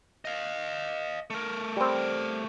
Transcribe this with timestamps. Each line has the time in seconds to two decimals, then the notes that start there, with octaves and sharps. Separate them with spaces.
0.25 D#5 F5
1.30 A3 A#4
1.77 G3 C4